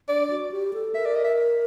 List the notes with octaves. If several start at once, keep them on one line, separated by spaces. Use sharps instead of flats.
D4 D5
F#4
G4
A4
A#4 E5
D5
D#5
E5